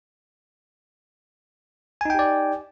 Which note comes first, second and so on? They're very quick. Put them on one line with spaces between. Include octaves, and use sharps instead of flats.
G#5 D#4 G5 G4 D5